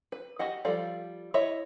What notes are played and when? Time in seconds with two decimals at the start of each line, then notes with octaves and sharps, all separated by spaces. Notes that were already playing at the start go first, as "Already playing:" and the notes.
0.12 B4
0.39 F#4 G4 D#5 F#5
0.65 F3 G3 A4 D5 F5
1.34 E4 C#5 D#5 E5